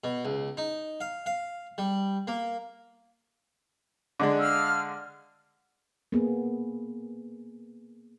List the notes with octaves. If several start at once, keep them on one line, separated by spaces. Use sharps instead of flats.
B2
C#2
D#4
F5
F5
G3
A#3
D3 G#3 D4
F5 E6 F6
A#3 B3 G#4